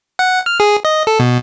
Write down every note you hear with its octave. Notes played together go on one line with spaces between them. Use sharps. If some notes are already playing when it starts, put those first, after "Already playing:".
F#5
F6
G#4
D#5
A4
B2